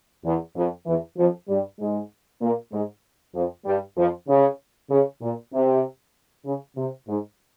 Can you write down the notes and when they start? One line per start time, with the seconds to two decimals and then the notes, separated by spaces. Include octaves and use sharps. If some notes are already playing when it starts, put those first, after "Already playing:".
0.24 E2
0.56 F2
0.86 E2 E3
1.17 F2 F3
1.48 G2 G3
1.79 G#2 G#3
2.41 A#2 A#3
2.72 G#2 G#3
3.34 F2 F3
3.66 G2 G3
3.97 F2 F3
4.28 C#3
4.90 C#3
5.21 A#2
5.52 C3
6.45 C#3
6.76 C3
7.08 G#2